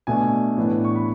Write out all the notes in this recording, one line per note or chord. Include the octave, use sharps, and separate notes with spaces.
B2 A3 D4 G#5
A2 E3 B3 D4
C#6
B5